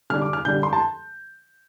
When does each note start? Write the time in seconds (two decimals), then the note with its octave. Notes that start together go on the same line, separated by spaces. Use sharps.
0.10 D3 G3 D4 F6
0.22 D6
0.33 F6
0.45 D3 G3 D4 G6
0.63 C6
0.73 A5